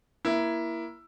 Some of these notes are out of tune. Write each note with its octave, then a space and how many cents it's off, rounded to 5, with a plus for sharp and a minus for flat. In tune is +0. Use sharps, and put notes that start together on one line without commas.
A#3 +20 E4 +10